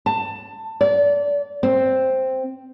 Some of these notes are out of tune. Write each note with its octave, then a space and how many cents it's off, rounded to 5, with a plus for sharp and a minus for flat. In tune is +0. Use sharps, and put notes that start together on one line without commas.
A5 +20
D5 -25
C4 +0